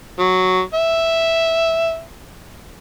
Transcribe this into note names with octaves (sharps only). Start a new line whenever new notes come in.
F#3
E5